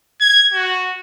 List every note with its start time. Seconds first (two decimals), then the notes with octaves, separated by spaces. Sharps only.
0.21 G#6
0.54 F#4